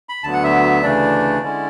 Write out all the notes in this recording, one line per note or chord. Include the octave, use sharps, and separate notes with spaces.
B5
D2 D3 F#3 B3 A5
F#5
E5
D2 C#3 E3 A3 D4 D5
D3 G#3 C#4 E4